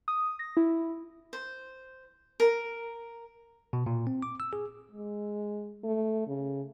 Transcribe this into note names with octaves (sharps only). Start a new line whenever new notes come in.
D#6
A#6
E4
C5
A#4
B2
A#2
C4
D6
E6
G#4
G#3
A3
C#3